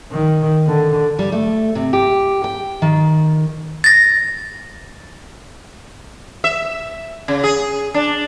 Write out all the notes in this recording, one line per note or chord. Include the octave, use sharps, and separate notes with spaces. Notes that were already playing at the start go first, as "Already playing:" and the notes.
D#3
D3
G3
A3
C3
G4
G5
D#3
A6 A#6
E5
C#3
G#4
D4